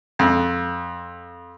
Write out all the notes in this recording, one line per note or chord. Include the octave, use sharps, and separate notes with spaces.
F2